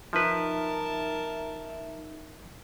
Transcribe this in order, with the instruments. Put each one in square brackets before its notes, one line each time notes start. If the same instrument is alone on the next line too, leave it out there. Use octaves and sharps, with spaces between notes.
[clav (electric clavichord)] F3 B4 [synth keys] D#4 E5 [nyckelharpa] A#4 A5